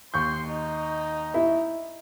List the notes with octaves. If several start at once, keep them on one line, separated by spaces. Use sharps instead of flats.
D#2 C6 C#6 G6
D#4
E4